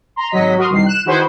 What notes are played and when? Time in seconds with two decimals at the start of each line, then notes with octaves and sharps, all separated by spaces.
0.16 A#5 C6
0.30 G#1 F#3 D#5 B6
0.58 F#4 A#4 C6 D#6 F6
0.70 C2 D#3 C7
0.86 F#6 E7
1.05 D#3 E4 F#4 G#4 B4 C5